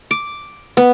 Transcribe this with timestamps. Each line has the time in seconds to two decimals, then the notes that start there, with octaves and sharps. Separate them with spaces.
0.11 D6
0.77 B3